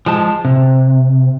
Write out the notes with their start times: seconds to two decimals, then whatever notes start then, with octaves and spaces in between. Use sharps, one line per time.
0.06 F3 G#3 A5
0.45 C3